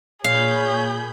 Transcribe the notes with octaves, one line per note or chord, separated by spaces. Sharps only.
A#2 G#4 C#5 F5 B5 G6